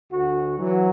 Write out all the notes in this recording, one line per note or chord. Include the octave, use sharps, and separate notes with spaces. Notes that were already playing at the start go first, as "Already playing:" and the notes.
D2 F#4
E3 F#3